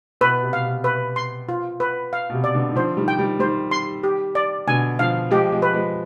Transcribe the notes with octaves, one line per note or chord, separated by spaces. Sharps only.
B2 B4
C3
B2 F5
C3
B4
C6
F4
B4
F5
B2
C3
D5
B2 D3
D#3
D3 F3 C5
D#3 G3
G5
D#3 G3
D#3 G3 C5
C6
G4
D5
B2 D3 G#5
D3 F3 F5
F3 G#3 G4
F3 G#3
B4
F3 G#3